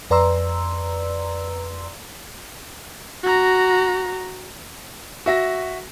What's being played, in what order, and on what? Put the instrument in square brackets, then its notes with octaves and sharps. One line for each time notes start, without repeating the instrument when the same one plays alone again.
[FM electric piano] F2 B4 D5 A#5 C6 E6
[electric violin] F#4 A#5
[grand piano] F#4 E5 A#6